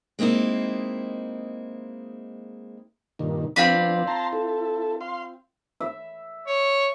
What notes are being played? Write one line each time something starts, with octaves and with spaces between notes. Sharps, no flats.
G#3 A#3 C4 D#4 E4
G2 A#2 D#3
F3 B3 C4 D4 F4 B5
A5 A#5 C6
E4 A4
F5 C6
E5
C#5